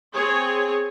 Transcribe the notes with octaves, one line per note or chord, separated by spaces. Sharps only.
C4 G#4 C#5